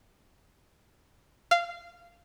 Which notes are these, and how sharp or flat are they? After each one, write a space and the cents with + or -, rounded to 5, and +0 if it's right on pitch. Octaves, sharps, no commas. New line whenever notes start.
F5 -15